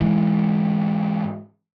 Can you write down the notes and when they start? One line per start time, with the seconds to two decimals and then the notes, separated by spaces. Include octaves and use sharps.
0.01 G#2 E3